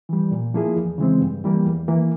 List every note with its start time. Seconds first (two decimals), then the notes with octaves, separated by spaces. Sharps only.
0.09 E3 G3
0.31 A#2
0.54 F3 A#3 E4 G#4
0.76 E2
0.98 C#3 E3 G#3 C4
1.21 G2
1.44 E3 G3 A#3
1.65 E2
1.88 E3 A#3